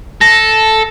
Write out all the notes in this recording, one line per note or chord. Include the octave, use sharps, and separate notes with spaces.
A4 A#6